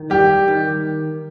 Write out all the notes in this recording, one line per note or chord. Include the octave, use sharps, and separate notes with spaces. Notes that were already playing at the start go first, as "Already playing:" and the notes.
Already playing: D#3
G3 G4
D#3